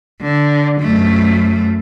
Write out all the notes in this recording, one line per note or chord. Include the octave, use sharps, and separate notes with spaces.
D3
F#2 A3